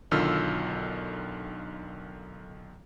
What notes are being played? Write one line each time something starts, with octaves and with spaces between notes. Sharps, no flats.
B1 D3 D#3 F4 E6 F6